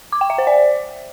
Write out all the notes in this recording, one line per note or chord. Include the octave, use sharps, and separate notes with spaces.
D6
G5
E5
C5
D5